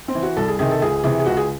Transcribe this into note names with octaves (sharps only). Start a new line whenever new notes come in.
C4
E3
F#4
C2 A4
G#4
C3 D#3 G#4
A4
C#2 G#4
C3 E3 G#4
G#4
C#2 F#4
G#4